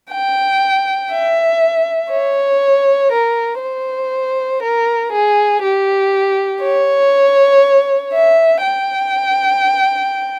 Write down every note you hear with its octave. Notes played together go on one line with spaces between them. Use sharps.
G5
E5
C#5
A#4
C5
A#4
G#4
G4
C#5
E5
G5